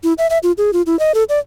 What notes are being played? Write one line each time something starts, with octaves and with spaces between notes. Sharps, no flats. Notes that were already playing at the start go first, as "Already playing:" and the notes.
E4
E5
E5
F4
G#4
F4
E4
D#5
A4
D5